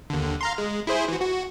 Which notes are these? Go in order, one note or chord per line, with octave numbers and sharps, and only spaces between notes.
D#2 D3
F5 A#5 C6
G#3
E4 G#4 C5
E3 F#4
F#4